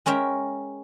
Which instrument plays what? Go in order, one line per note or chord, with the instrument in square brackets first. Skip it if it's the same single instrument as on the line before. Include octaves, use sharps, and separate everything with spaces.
[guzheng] G#3 C#4 A#4 E5 G5